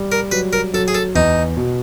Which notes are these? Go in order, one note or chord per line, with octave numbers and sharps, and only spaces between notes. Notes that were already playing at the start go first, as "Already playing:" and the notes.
Already playing: G3
A#4
F#3 B4
A#4
F#3 A4
G#4
A4
E2 D#4
B2